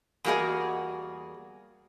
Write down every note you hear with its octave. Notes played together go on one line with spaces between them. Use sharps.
E2 G3 A#3 F#4 G#4 D#5